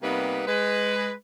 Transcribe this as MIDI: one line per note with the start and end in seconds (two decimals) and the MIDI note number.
0.03 0.43 48
0.03 0.43 55
0.03 0.43 58
0.03 0.43 59
0.03 0.43 63
0.03 0.43 71
0.47 1.12 56
0.47 1.12 71